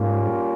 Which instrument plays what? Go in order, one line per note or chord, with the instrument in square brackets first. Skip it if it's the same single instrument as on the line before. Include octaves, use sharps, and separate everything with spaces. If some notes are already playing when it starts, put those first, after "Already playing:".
Already playing: [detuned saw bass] G#2 [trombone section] G3 A#3 C#4 F4